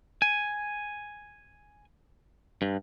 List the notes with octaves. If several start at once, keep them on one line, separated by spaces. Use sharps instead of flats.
G#5
G2